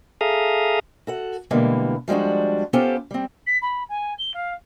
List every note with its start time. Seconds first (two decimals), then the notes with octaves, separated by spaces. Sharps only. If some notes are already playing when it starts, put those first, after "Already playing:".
0.21 G#4 A4 E5 F5 A#5 D#6
1.07 F#4 A4 F#5
1.51 B2 D3 E3 G3 G#3 A#3
2.08 F3 G3 G#3 D4 F#4
2.73 B3 C#4 F4 G4 A4 C5
3.11 G3 C4
3.46 B6
3.61 B5
3.89 G#5
4.18 G7
4.34 F5